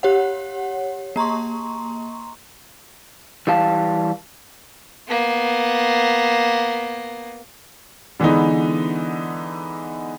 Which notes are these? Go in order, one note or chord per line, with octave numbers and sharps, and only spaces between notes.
G4 C#5 F#5
A#3 A#5 C6 C#6
E3 G3 G4 F5 A5
A#3 B3
D3 E3 G#3 B3 D#4